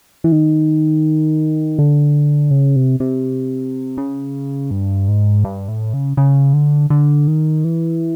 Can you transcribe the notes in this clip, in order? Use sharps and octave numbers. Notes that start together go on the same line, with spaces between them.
E3
D#3
D3
C#3
C3
C3
C#3
G2
G#2
G2
A2
C#3
C#3
D3
D3
D#3
E3